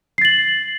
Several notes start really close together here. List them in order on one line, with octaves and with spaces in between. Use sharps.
C7 A6 F#7